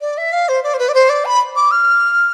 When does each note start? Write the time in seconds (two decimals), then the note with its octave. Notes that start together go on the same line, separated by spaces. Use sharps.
0.01 D5
0.18 E5
0.32 F5
0.49 C5
0.63 D5
0.74 C5
0.79 B4
0.89 D5
0.94 C5
1.09 D5
1.25 B5
1.56 D6
1.71 F6